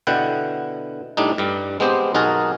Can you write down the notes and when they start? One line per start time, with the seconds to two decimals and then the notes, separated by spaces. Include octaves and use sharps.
0.07 B2 D3 E4 F#5 G5
1.17 A2 G3 D4 D#4
1.38 G2 G3
1.80 G#3 B3 C4 G4 C5
2.14 B1 D#4 F#4 G#4 A#4 A5